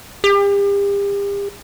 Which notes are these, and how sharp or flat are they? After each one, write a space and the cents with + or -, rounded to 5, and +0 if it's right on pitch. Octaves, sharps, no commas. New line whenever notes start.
G4 +40